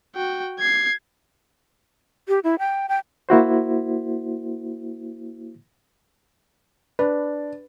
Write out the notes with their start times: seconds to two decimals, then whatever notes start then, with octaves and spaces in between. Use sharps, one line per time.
0.15 F#4 G5
0.59 G#6 C7
2.28 G4
2.44 E4
2.59 G5
2.89 G5
3.29 A#3 E4 F#4 C5
6.99 D4 B4